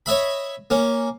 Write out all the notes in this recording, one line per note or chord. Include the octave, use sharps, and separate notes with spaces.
C#5 D#5 E5 B5
A#3 C#4